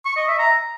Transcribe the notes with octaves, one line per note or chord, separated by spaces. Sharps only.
C#6
D#5
E5
A#5